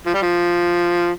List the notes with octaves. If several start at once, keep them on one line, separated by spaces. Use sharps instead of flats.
F3
G3
F3